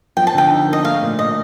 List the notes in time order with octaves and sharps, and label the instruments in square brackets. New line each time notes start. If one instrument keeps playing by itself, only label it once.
[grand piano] F3 [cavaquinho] G5
[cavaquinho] A5
[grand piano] D3 [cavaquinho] G5
[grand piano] D#4
A#3
[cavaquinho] D#5
[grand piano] A3 [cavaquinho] F5
[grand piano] A#2
[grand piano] A#2 [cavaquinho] D#5